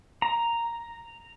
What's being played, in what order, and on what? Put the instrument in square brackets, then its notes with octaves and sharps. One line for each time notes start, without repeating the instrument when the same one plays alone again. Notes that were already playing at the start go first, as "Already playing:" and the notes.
[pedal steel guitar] A#5